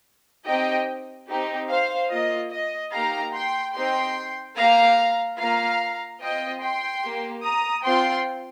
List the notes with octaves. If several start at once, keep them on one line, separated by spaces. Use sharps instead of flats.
C4 D#4 G4 D#5 G5
C4 D#4 G4
C5 F5
A#3 F4 D#5
D#5
A#3 D#4 G4 F5 A#5
G5 C6
C4 D#4 G4 G5 C6
A#3 G4 F5 A#5
A#3 F4 F5 A#5
C4 F4 D#5 G5
G5 C6
A#3 G4
A#5 D#6
C4 F4 G5 C6